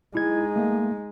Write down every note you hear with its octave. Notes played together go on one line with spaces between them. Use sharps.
G#3 D#4 E4 G#6
A3 A#3